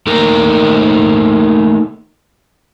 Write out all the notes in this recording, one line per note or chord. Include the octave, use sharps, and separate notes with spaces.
A3 A#3 D#4 A#4